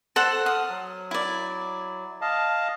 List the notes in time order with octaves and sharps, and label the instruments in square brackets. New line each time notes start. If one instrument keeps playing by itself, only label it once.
[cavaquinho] A4 C5 F#5
[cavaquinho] D#6 [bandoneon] F6
[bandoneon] F#3
[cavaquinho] E4 D5
[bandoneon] D#5 F5 A5